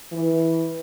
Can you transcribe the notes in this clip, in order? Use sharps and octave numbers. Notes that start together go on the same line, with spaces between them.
E3